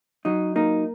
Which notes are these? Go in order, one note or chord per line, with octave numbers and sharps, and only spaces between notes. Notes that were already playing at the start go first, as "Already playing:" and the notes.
F#3 D#4
A#3 D#4